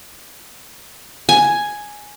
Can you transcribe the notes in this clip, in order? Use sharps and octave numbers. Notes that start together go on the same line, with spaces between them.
G#5